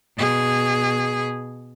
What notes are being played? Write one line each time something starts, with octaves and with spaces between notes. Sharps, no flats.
B2 G#4